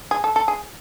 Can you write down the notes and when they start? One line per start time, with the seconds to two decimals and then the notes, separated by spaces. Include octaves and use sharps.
0.11 G#4
0.24 A4
0.36 A4
0.48 G#4